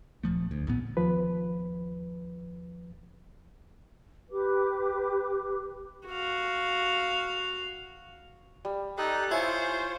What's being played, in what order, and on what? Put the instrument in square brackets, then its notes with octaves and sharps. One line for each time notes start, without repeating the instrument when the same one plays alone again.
[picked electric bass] D#1 F3 A3
D2
A1 A#2 B3
[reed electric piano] D#2 F3 B4
[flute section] G4 B4 D6
[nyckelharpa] F#4 F5
[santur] G3
[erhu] D#4 [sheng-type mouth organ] G4 A4 F#6
[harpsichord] E4 [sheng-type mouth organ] F4 C#5 [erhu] C5 [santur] G#5